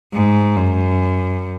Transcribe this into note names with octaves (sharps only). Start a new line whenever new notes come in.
G#2
F#2